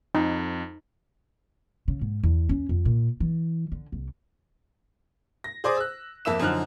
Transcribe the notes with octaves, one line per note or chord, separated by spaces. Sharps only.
F2 D#4
C#3
G#2
E2
C#4
F2
A#2
E3
D3
C2
A#6
G#4 C5 D5 D6 D#6
E6 F#6
F2 A#3 E5 E6 E7
F#2 D3 F3 D#4 F6 F#6